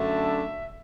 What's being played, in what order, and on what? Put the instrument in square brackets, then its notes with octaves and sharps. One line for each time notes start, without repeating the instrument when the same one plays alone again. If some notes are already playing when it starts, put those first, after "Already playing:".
Already playing: [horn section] F#2 D3 A3 D4 E5